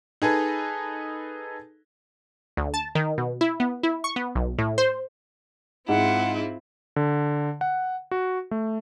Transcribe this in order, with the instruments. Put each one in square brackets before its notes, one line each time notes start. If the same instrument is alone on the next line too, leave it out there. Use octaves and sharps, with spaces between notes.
[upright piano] D#4 G#4 A4 B4
[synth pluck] D2
A5
D#3
B2
E4
B3
E4
C#6
B3
B1
A2
C5
[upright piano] G#2 [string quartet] C4 E4 F4 [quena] F#5
[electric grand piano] D3
F#5
F#4
A3